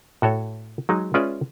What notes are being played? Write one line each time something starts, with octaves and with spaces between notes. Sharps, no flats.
A2 F#4 A4 C#5
F#3 G#3 D#4
G#3 C#4 F4 B4 D5 E5